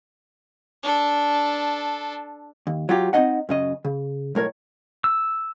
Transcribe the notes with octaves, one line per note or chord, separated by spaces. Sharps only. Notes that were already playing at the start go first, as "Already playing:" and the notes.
D4 A4
D#2
F#3 F4 G4
C4 C#4 D#4 D#5 F#5
F#2 C#3 D#5
C#3
B1 A2 A#4 C#5
E6